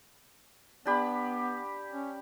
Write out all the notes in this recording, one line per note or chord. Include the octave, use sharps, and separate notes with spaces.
B3 D4 G4 B5
C#4